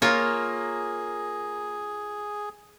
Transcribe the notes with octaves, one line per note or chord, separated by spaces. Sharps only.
A#3 F4 G#4 A#4 C#5